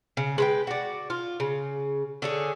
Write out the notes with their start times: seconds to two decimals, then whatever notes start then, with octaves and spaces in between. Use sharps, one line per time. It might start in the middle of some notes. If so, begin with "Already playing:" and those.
0.17 C#3
0.38 G#3 B4 G5
0.67 F#4 D5
1.10 F4
1.40 C#3
2.22 D3 C#4 G#4